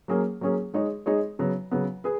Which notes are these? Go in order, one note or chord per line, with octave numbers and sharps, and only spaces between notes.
F#3 A#3 C#4 G#4
F#3 A#3 C#4 G#4
G#3 D#4 G#4 C#5
G#3 D#4 G#4 C#5
C#3 F#3 B3
C#3 F#3 B3
G#4 B4